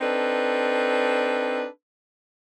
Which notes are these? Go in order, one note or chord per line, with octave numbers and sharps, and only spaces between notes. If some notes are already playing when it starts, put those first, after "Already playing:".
C4 D4 D#4 A4 B4